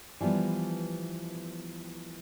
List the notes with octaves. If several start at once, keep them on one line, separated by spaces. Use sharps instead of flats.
E3 F3 G3 B3